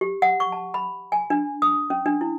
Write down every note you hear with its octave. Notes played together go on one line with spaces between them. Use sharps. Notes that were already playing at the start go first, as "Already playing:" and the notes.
G4
F#5
C#6
A5
B5
G#5
D4
D#6
C#4
D4
E4